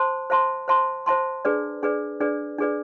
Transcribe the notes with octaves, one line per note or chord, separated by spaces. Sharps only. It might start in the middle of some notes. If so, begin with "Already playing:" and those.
Already playing: C5 A5 C6
C5 E5 A5 C6
C5 E5 A5 C6
C5 E5 A5 C6
D4 G#4 B4 D5
D4 G#4 B4 D5
D4 G#4 B4 D5
D4 G#4 B4 D5